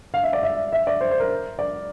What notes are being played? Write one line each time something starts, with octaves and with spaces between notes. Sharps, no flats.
F5
E5
D5
E5
E5
D5
C5
C5
A#4
D5